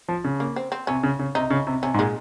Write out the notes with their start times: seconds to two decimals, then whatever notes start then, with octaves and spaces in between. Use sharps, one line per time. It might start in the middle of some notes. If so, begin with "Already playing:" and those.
0.08 F3
0.24 C#3
0.40 A#3
0.56 C4
0.72 C4
0.87 C3 C#4
1.03 C#3
1.19 C#3
1.35 C3 D#4
1.50 C#3
1.67 C3
1.83 C3 C#4
1.94 G#2
1.99 A#2 G#3